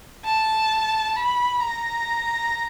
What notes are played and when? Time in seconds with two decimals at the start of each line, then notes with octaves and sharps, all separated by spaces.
0.25 A5
1.16 B5
1.60 A#5